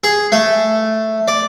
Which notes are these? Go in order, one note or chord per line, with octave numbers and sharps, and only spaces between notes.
G#4
A3
D5